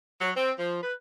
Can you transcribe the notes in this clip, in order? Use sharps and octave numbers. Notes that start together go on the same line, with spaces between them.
F#3
C4
F3
B4